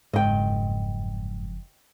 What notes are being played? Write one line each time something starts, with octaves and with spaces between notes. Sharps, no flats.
F#1 F2 G#2 D#5 G5